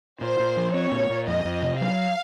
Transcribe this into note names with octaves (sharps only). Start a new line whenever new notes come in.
A#2 C5
A#2
F3
C4 C#5
A#2
A#2
F2 D#5
F2
C3
F#3 F5